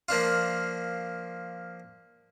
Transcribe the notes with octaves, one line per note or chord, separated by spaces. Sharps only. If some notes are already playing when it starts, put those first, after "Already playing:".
F3 A#3 D4 F4